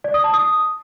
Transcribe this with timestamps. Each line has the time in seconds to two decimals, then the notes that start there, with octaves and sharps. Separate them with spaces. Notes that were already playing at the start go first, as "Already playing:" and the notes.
0.04 D5
0.14 D#6
0.24 A5
0.34 D#6